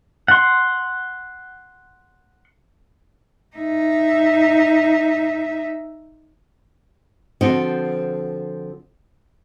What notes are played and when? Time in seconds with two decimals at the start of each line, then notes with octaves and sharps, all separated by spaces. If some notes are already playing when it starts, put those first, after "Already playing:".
0.28 F#5 C6
3.56 D#4 E5
7.41 D3 F3 C4 F#4 D#5